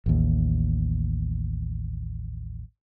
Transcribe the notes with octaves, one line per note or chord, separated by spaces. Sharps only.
A1 D#2